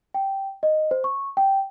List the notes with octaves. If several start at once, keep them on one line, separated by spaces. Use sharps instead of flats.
G5
D#5
C5
C#6
G5